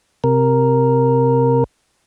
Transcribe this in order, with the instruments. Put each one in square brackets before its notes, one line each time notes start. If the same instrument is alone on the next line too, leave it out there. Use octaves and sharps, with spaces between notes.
[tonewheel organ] C3 A#4